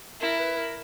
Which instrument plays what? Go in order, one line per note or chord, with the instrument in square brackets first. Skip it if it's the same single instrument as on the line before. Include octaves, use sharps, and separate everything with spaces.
[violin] E4 [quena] A#4
[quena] B4
A#4